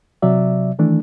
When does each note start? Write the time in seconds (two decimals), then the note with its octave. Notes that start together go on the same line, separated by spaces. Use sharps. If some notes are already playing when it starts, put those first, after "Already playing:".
0.22 C3 F#3 D5 E5
0.79 D#3 E3 A3 D4